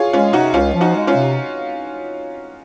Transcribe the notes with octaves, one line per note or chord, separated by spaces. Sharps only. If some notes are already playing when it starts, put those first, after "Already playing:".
Already playing: F4 G#4 C#5
G#3 C#4 F4
C3 D#4 F#4
C#2 C#4 F4
F3
D#4 F#4
G#3
C#4 F4
C3